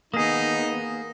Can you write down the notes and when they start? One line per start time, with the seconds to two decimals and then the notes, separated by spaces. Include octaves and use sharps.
0.14 D#3 A#3 B3 D#4 G#4 D#6 A#6